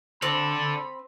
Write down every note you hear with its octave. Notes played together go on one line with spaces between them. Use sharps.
C4 A4 D5 B5